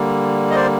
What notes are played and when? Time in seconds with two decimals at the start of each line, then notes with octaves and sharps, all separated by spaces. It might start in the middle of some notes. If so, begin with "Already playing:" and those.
Already playing: D3 G3 A#3
0.51 D#5
0.55 C5 D5